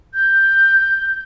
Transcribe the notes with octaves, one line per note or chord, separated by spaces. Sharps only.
G6